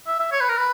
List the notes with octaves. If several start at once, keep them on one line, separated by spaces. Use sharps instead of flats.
E5
E5
C#5
B4
A#4
B4